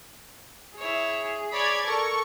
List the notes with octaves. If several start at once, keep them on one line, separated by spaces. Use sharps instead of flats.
E4 G#4 C#5
C#5 D5 B5 G#6
A4 A#4 C#6